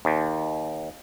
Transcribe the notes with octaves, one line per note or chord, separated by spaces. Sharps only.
D#2